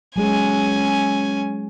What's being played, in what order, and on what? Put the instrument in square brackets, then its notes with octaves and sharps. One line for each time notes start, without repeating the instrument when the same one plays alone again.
[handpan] F#3 G#3 G#4 [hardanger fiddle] C#4 G#5